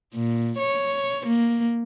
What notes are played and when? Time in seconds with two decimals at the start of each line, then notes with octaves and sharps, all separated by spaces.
0.14 A#2
0.59 C#5
1.27 A#3